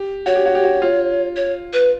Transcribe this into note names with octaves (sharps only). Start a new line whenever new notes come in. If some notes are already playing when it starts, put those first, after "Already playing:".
Already playing: G4
F#4 C#5
G4
F#4
G4
F#4
F4
C#5
B4